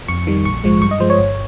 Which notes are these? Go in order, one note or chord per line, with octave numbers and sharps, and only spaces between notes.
F2 C#6
D#3 G3
A#1 C#6
G#2 F3 G#3
G2 C#6
D#5
F3 G#3 C5
C#5
G1